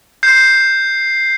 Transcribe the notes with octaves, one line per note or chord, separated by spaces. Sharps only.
G6 C7